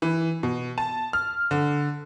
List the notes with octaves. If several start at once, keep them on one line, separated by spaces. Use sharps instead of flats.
E3
B2
A5
F6
D3